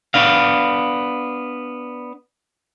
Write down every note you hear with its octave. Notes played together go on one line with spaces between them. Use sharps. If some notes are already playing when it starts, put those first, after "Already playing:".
B3 D4 F5